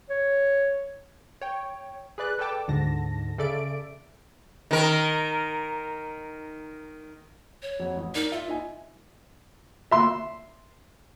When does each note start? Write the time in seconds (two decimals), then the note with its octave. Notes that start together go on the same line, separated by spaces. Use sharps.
0.10 C#5
1.41 C#5 G5
2.18 G#4 B4 D5 F#6
2.39 A4 B4 D5 G5 A5 D6
2.68 D2 G#2 D3 A5 A#6
3.38 C#3 A4 D5 E5 D7
4.71 D#3 A#4
7.63 C#5
7.80 F2 F#3
7.97 A1
8.15 D#4 A#4 D5
8.32 F4 E5
8.48 D#4 E4 G#5
9.91 E5 C6